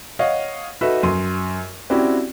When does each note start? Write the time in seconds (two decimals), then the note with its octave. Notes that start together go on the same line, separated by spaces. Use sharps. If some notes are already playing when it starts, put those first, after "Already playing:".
0.19 C#5 D#5 F5 F#5
0.81 D#4 F#4 A4 B4 E5
1.03 F#2 C6 D#7
1.90 C4 C#4 E4 F#4 G4 D5